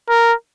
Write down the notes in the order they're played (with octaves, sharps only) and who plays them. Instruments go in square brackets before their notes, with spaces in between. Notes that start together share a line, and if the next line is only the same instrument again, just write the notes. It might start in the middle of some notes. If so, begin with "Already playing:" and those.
[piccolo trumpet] A#4